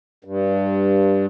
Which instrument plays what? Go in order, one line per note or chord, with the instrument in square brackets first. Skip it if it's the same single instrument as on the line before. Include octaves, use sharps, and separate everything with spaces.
[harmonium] G2